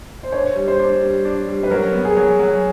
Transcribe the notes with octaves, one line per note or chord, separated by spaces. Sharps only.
C5
D4 C#5
G3
C5
D4
G3
D4
G3
B4
F#3 A#4
B3
G#4
F#3
F#3